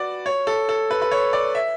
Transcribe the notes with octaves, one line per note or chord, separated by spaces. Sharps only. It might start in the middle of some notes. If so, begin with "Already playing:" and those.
Already playing: F#4 B4 D5
C#5
A4
A4
B4
B4
C#5
D5
E5